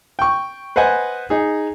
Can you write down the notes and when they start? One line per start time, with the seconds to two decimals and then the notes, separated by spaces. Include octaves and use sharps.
0.19 G5 C#6
0.76 B4 C5 D#5 F#5 G#5
1.30 D#4 G#4